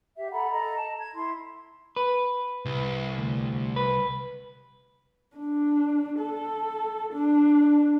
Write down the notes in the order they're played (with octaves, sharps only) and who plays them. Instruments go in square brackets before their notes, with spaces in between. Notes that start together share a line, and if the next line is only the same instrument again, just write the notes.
[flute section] G4 E5
A4 F#5 A#5 B5
A4 D#5 A#5
A5
G#6
E4 C6
[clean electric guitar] B4
[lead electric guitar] C2
[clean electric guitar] D2
B4
[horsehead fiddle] D4
A4
D4